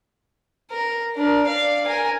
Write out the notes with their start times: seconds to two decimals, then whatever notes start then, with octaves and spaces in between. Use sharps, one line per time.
0.71 A#4
1.15 D4 A#4
1.47 D5 F5
1.86 A#4 G#5